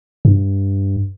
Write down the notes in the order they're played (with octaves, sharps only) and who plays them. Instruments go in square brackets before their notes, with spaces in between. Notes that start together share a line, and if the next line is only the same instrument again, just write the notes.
[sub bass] G2